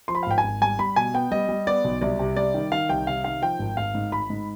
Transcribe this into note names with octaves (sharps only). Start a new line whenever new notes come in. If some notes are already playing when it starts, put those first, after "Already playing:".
F3 C6
B5
F5
G#1 G5
G#5
G#1
G3 G#5
G3 B5
B2 G#5
B3 G5
G3 D#5
G3
B3 D5
B1
C2 D5
C3
G3 D5
D#3
D#3 F5
C2 G5
C3 F5
D#3 F5
F3 G5
G#1
G#1 F5
G#2
G#1 B5
G#2